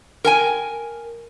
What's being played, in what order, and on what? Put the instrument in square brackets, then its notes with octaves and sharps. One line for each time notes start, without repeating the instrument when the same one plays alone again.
[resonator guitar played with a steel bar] A#4 G5 G#5